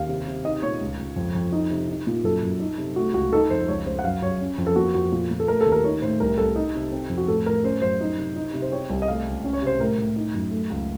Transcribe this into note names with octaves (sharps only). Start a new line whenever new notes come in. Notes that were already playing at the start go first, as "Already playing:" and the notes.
Already playing: D#2 F5
C3
C3
D#4 D#5
A#2 C#5
C#2
C#2
F2
F2
D#4
C3
D#4
A#2
F#2 A4
F#2
D#4
C3
A3 F#4
C#2 F#4
D#4 A4
F2 C5
C#2 C#5
C#2 C5
F#5
F#2 F5
F#2 C#5
C#4
F2
A4
A#3 F#4
F2 F#4
A#2
A#2
A4
A3 A#4
A4
D#2
A#4
D#4 C#5
A2 C5
C2 A#4
C2 A4
D#4
C3
C4
F2
F#4
A2 A4
A2 A#4
C#4 C5
F#2 C5
D#4
C3
D#4
C3
C5
C4 C#5
C2
D#5
A3 F5
C#2
C#4
C#5
C3 C5
A2 A#4
A2
D#4
F#2
A3
C#2